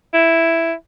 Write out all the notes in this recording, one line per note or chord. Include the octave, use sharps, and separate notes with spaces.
E4